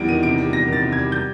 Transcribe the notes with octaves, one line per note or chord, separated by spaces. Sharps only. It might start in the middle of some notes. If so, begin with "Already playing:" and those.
Already playing: E2 G3 D7
D#3 D#7
C3 D7
G3
E2 A#6
D#3
A6
C3
G#6
G3
G6